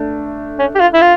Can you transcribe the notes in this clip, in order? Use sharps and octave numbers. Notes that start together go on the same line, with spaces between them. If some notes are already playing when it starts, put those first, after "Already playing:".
Already playing: A3 D4
C#4
G4
F4
E4
F4